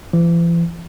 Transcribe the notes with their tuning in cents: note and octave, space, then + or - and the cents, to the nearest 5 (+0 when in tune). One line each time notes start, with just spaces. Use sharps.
E3 +45